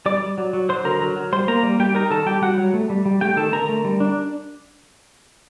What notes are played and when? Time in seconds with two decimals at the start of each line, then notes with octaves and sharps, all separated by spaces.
0.06 G3 D5 D6
0.22 G3
0.38 F#3
0.53 F#3
0.69 F#3 C5 C6
0.85 D3 A#4 A#5
1.01 F#3
1.16 F#3
1.32 G3 C5 C6
1.48 A#3 A#4 A#5
1.63 G3
1.79 G3 G4 G5
1.95 D#4 A#4 A#5
2.10 D#3 A4 A5
2.26 G3 G4 G5
2.42 G3 F#4 F#5
2.58 F#3
2.74 A3
2.90 G3
3.06 G3
3.21 A3 G4 G5
3.37 D#3 A4 A5
3.52 D3 A#4 A#5
3.69 A3
3.85 G3
4.00 D4